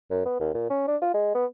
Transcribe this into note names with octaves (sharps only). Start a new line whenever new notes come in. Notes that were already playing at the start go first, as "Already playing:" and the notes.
F#2
B3
D#2
A#2
C#4
D4
F4
G#3
B3